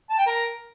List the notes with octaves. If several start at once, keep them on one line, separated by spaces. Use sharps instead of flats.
A5
G5
A#4